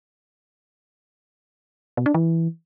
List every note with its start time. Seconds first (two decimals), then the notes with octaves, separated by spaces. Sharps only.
1.97 B2
2.06 D4
2.14 E3